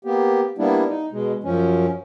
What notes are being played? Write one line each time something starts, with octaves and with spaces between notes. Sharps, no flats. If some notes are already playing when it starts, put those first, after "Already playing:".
A#3 B3 G4
G3 A#3 B3 D4 E4
D#4
B2 G#3
F#2 F3 C#4